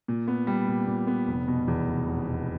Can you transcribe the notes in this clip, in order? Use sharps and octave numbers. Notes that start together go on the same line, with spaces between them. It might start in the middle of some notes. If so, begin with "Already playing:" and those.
A#2
B3
G3
A#2
A#2
B3
F1
B2
E2
F1
F1
B2